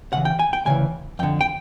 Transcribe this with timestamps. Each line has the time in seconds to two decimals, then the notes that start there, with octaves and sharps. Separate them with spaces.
0.12 D2 C#3 E3 F#5
0.25 G5
0.39 G#5
0.53 G5
0.65 D2 C#3 E3 G#5
1.19 F2 D3 G5
1.41 G5